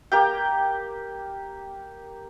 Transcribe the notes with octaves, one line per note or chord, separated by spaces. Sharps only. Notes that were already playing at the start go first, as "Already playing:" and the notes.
A#3 G4 G5